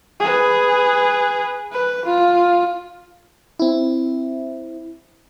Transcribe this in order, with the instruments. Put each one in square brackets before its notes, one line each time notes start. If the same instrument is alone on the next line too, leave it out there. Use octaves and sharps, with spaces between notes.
[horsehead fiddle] G#4 B4
B4
F4
[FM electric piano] C4 E4